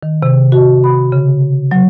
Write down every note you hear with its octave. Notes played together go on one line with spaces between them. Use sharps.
D#3
C3
F#4
B5
C#3
F#3